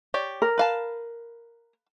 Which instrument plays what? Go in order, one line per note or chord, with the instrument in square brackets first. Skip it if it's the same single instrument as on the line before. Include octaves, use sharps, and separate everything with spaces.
[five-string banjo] G4 C#5 D5
[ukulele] A#4
[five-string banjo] B4 F5 A5